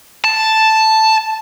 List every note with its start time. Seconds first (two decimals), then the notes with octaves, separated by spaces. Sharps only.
0.24 A5